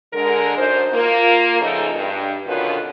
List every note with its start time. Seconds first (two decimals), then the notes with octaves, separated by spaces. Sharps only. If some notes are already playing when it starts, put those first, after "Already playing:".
0.13 D3 G#3 A#4
0.57 F#2 D4 D#4 C5
0.93 A#3 F4
1.61 C#3 F3 A3 B3 D#4
1.94 G2
2.46 B2 D3 D#3 C#4 F4 B4